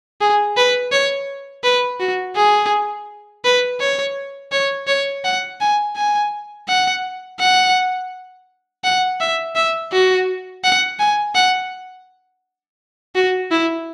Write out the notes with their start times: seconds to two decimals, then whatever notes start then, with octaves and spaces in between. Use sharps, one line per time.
0.21 G#4
0.57 B4
0.92 C#5
1.64 B4
2.00 F#4
2.36 G#4
3.45 B4
3.80 C#5
4.52 C#5
4.87 C#5
5.24 F#5
5.60 G#5
5.96 G#5
6.68 F#5
7.40 F#5
8.84 F#5
9.20 E5
9.55 E5
9.92 F#4
10.64 F#5
10.99 G#5
11.35 F#5
13.15 F#4
13.51 E4